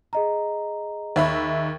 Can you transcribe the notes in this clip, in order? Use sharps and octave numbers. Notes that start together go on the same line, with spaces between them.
G#4 D#5 A#5
D#2 E5 B5